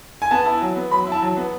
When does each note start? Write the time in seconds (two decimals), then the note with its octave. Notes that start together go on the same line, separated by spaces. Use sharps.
0.22 G#5
0.31 B3 A5
0.46 E4
0.61 F#3
0.76 B3
0.91 F#3 B5
1.07 E4
1.12 A5
1.22 F#3
1.37 B3